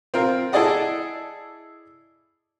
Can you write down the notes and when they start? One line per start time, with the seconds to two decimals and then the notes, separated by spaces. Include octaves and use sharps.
0.14 C4 F4 A#4
0.52 E4 G#4 A4 D5 D#5 F#5